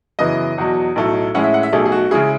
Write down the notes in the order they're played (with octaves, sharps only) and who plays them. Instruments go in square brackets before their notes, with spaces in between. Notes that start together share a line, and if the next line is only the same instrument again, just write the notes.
[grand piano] F#2 C#3 E3 B3 E4 D#5
E2 B2 F#3
B1 A2 F#3 A3
A2 G#3 C#4 E4 F#5
E5
F#5
E5
B1 B2 A3 G#4
G#4
F#4
C#3 G#3 C#4 E4 G#4